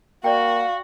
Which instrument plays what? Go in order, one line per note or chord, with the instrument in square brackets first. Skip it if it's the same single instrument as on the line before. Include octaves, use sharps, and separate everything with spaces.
[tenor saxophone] A#3 [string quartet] F#4 [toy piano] D5 G5 [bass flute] F5